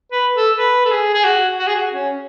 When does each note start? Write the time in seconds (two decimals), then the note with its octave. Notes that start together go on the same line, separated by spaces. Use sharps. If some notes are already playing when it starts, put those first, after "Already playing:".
0.12 B4
0.35 A4
0.57 B4
0.85 A4
0.91 G#4
1.14 G#4
1.25 F#4
1.59 F#4
1.67 G#4
1.75 F#4
1.93 C#4